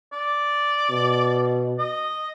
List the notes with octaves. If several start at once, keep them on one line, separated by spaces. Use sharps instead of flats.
D5
B2
D#5